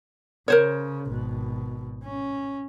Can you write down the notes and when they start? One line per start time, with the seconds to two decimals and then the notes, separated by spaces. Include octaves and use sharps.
0.48 C#3 A#4 C5 C#5
1.08 G#1 B2
2.03 C#4